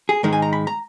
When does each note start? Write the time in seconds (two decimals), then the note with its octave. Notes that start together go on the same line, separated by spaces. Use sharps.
0.09 G#4
0.23 G#2 D#3 G#3 D#4 A#4
0.33 G#5
0.42 A#5
0.53 B5
0.67 A#5